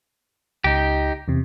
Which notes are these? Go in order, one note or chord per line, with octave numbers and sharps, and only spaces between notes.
C#2 D#4 G4
E2 C3